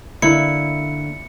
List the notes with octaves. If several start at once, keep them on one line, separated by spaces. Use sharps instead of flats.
D3 A#3 E4 C#7